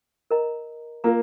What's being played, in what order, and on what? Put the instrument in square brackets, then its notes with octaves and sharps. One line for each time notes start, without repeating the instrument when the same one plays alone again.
[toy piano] A#4 D#5 A#5
[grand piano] A#3 [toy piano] F4 A#4 F5 A#5